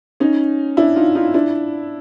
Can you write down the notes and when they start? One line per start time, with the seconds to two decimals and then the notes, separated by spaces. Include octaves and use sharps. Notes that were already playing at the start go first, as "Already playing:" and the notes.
0.20 C#4 D#4
0.77 D4 E4
0.96 D#4 F4
1.15 D#4 F4
1.34 D4 E4